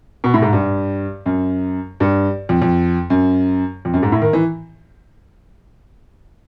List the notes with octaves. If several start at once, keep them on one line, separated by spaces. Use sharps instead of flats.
B2
A2
G#2
G2
F#2
G2
F2
F2
F#2
F2
F#2
G#2
A2
D#3
E3